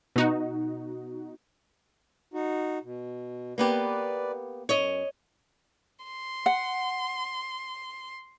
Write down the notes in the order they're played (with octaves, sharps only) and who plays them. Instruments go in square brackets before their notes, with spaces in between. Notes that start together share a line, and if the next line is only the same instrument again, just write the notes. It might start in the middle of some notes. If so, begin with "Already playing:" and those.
[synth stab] B2 D#4 F#4
[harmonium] D#4 F#4
B2
[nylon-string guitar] A#3 B3 G4 [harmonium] B4 D5
[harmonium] F#2 [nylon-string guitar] C#5 D#5
[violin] C6
[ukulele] F#5